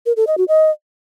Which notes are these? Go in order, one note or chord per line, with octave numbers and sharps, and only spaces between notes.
A#4
A4
D#5
F#4
D#5